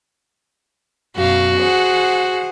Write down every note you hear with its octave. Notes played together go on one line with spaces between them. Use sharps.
F#2 B2 F#4 F5
G#4 C5 F#5